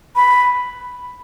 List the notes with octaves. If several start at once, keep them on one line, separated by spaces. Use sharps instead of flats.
B5